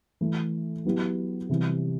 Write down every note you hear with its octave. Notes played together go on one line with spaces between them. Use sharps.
E3 A3 E4
F#3 B3 E4 G4
C3 E3 G3